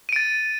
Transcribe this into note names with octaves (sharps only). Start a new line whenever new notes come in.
A6 D7 D#7